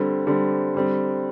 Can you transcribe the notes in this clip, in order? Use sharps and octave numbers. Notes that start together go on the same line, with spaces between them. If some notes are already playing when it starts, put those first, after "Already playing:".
Already playing: D3 G3 C4
D3 G3 C4
D3 G3 C4